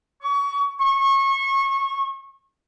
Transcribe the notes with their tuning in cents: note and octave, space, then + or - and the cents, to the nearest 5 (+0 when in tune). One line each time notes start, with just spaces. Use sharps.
C#6 +30
C#6 -25